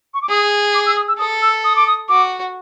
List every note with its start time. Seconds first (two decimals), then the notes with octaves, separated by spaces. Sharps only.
0.14 C#6
0.22 D6
0.29 G#4 D#6
0.74 D6
0.86 E6
0.96 D#6
1.08 E6
1.19 A4 D#6
1.42 E6
1.64 D#6
1.76 D6
1.87 D#6
2.09 F#4 D6